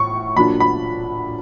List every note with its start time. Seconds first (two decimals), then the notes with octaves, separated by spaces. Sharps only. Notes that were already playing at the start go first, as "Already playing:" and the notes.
Already playing: A2 C#6
0.36 A#2 F#3 A#3 D4 B5
0.60 B5